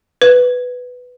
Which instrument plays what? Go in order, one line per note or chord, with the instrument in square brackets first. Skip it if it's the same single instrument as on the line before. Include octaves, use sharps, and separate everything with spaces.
[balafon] B4